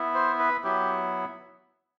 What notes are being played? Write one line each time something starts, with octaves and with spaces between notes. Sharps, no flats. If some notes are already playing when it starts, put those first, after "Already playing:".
Already playing: B3 E4
C5
B4
F#3 B3 E4 G4